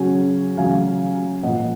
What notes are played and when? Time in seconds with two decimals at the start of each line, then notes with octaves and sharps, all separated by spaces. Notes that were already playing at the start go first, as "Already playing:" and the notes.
Already playing: C#3 F#3 C#4 G#5
0.57 C#3 F#3 C#4 F5 G#5
1.43 A#2 F3 A#3 D#5 F#5